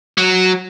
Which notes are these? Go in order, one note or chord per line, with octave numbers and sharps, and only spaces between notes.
F#3